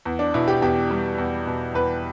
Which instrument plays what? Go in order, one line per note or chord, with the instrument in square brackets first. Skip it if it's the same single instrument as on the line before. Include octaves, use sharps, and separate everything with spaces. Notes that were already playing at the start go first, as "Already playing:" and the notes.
[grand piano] E2
D4
B2 E4
G4
E2 G4
G3
E2
B2
E2 B4